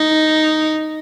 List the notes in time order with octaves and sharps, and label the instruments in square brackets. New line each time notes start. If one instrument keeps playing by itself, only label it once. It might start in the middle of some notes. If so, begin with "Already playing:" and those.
Already playing: [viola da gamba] D#4